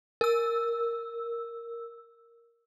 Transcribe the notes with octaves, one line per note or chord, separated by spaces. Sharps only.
A#4 E6